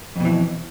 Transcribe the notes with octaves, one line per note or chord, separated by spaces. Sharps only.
F2 B2 E3